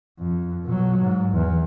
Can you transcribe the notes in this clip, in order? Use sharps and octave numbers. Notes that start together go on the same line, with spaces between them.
F2
B2 F#3
G#2
E2